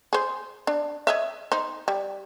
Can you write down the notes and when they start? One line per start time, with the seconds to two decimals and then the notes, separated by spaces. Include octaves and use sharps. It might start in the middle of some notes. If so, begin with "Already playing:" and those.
0.13 G#4 C5
0.67 D4
1.07 C#5 D#5 E5
1.52 D#4 C5
1.88 G3